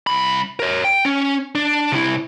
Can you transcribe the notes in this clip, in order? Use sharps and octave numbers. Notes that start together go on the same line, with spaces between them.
C2 B5
A#4 C#5
G5
C#4
D4
C3 E4